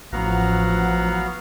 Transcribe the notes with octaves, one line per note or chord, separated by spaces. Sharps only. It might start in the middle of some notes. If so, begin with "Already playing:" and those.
A1 F3 F#3 B3 F5 F#5 A#5